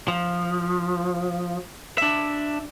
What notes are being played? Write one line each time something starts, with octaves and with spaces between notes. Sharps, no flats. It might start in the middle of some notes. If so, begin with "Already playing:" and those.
F3
D4 E5